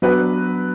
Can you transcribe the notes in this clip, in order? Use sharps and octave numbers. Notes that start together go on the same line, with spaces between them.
F#3 B3 D4 F#4 B4